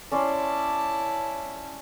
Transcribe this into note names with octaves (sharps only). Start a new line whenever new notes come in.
C#4 E4 D5 A5 C6